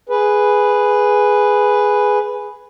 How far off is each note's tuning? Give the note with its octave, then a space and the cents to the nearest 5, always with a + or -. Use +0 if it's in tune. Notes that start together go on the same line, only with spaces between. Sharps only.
G#4 +0 B4 +0